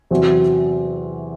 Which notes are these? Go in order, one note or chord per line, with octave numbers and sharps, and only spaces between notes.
E2 C3 F#3 C4 F#4